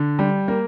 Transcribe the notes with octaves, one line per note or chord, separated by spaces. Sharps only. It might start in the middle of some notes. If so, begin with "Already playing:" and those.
Already playing: D3
G3
A#3